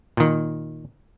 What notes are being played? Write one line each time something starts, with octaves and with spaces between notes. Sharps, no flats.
A#2 D#3